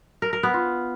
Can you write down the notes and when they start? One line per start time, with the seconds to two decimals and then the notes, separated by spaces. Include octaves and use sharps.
0.22 A#4
0.33 A#4
0.43 B3
0.54 F4